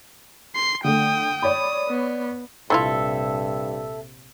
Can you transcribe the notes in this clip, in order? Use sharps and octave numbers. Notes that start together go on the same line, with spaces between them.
C6 C7
D3 A3 G5 D#6
C#5 D5 B5 D#6
B3
A#1 G2 C3 A3 E4 F4 A4 E5